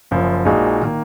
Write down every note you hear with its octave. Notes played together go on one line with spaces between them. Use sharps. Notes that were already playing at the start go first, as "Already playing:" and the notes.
F#1 F#2 F3
A#1 A#2 G#3 D#4 F#4
D#3 A#3